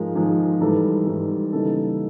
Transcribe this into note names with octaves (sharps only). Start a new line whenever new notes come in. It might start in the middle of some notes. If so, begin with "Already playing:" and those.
Already playing: G#2 F3 G#3 A#4
G#2 F3 G#3
G#2 E3 G3 A4
G#2 E3 G3
C#3 E3 G3 A#3 D#4 A4